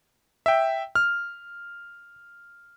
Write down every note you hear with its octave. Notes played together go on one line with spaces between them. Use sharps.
E5 G5
F6